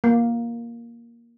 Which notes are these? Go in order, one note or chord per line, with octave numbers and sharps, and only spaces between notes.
A#3